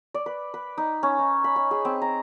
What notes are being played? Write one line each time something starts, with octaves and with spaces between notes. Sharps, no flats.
D5
B4
B4
D#4
C#4
D#4
B5
G#5
G#4
C4
A#5